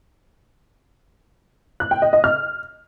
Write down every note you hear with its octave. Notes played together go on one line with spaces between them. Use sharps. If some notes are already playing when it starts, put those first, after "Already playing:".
F#6
G5
D#5
D#5
F6